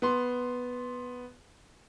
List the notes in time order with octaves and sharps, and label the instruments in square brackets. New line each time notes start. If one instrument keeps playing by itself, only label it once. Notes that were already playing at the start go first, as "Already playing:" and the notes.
[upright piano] B3 C6